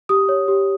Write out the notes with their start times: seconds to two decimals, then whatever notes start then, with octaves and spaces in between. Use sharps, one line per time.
0.09 G4 D#6
0.29 C#5
0.48 G4